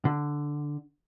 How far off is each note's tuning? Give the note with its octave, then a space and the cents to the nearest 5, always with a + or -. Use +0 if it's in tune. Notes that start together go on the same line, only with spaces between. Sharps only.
D3 +0